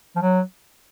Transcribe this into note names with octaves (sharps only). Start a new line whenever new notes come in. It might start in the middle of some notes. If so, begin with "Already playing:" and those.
F3
F#3